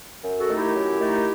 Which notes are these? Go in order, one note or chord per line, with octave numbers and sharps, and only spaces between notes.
F#2
F#4 A4
D#3 A3 D#4
E4 G4
F#2
D#3 A3 D#4